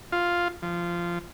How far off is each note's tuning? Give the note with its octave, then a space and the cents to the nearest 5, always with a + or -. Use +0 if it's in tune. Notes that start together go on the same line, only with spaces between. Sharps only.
F4 +0
F3 -15